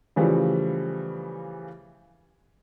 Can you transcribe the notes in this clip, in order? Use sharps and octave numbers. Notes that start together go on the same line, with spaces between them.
C#3 E3 F3 G3 A3